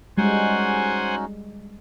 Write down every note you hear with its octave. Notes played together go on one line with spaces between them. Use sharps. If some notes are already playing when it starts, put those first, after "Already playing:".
G3 G#3 C#4 D#4 F#4 C5 F#5 G#5